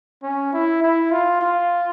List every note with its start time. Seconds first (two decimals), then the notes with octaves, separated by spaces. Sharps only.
0.23 C#4
0.53 E4
0.82 E4
1.11 F4
1.41 F4